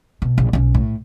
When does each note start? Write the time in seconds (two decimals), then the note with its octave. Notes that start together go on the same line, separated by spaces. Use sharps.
0.22 B2
0.38 A#1
0.53 B1 C#4
0.75 A2